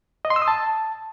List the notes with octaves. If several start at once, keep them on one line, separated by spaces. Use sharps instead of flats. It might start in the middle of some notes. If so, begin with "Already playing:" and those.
D#5
C6
E6
D#6
A5